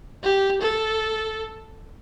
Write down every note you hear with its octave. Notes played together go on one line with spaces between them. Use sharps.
G4
A4